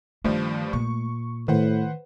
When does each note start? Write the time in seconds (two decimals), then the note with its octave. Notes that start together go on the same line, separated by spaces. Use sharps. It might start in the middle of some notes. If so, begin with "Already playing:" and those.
0.25 G2 D#3 F3 G3 A3
0.73 A#2 C#6
1.48 A2 D#3 B4 C5 F#5